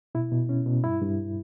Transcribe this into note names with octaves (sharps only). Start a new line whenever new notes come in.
B2 E4
B2
C#4
B2
G2 E4
G2